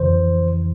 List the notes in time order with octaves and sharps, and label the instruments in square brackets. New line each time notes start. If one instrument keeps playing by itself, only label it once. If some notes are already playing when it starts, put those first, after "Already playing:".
Already playing: [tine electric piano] F2 C#3 E3 C5